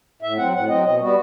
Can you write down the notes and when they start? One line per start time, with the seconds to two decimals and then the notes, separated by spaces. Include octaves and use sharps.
0.22 A2 E5
0.38 F#3 C4 F#5
0.53 A2 F#5
0.69 F#3 C4 D#5
0.84 B2 D#5
1.00 G3 B3 F#4